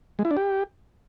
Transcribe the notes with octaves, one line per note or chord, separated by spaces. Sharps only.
G#3
E4
D4
G4